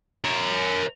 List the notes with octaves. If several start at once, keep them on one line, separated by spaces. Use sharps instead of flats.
A#4 C#5